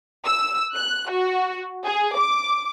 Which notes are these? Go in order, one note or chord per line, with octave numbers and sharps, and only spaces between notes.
E6
F#6
F#4
G#4
D6